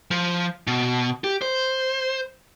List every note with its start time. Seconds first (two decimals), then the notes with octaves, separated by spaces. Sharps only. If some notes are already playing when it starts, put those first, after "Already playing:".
0.11 F3
0.67 B2
1.24 G4
1.42 C5